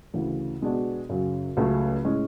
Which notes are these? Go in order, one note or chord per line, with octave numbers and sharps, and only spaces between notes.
D2 C#3 E3
B2 G#3 B3 D4 F#4
F#2 C#3 F#3
C#2 C#3 F#3 A3 C#4
A2 G#3 C#4